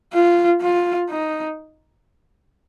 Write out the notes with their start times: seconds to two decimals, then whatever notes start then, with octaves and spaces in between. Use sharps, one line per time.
0.14 F4
0.62 F4
1.10 D#4